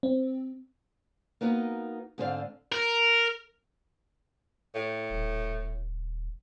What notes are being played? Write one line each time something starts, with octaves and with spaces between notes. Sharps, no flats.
C4
A#3 B3 D#4 F#4
G#2 D3 C4 C5 D5 F5
A#4
A2
D#1